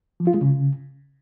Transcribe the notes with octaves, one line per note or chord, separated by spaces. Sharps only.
F3
F4
G#3
C#3